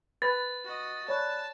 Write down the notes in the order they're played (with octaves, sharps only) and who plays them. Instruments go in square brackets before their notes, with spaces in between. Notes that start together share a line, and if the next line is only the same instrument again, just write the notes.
[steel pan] B4 [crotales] A6
[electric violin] F#4 D#5
[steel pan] C#5 [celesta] D5 B5 F#6 [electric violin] A5